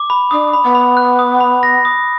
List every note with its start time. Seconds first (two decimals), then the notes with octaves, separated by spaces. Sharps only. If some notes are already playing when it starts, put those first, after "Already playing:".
Already playing: D6
0.10 B5
0.31 D4 D#6
0.53 B5
0.64 B3
0.75 B5
0.97 F#6
1.19 D#6
1.41 B5
1.63 A#6
1.85 D#6